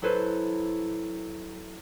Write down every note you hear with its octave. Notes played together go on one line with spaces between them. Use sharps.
F#3 E4 A4 B4 C5